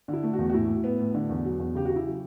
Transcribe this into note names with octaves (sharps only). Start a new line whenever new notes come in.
D3 E4
A3
F#4
E2
F#4
A2 E4
A2
B3
A2
D3
E2
F#3
E2
C#3 G4
F#4
C#3
E4
F#3